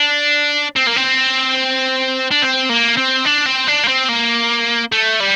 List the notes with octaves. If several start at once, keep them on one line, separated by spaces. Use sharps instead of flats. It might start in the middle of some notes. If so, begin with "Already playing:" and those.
Already playing: D4
C4
A#3
C4
D4
C4
A#3
C4
D4
C4
D4
A#3
C4
A#3
A3
G3